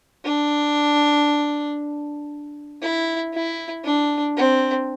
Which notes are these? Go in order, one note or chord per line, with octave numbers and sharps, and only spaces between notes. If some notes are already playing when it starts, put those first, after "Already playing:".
D4
E4
E4
D4
C4